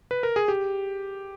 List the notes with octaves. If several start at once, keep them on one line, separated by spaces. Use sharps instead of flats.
B4
A#4
G#4
G4